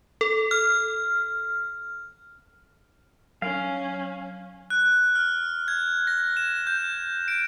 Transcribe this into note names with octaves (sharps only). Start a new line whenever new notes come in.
A4
F6
F#3 C#4 F5
F#6
F6
G#6
A#6
E7
G6
D7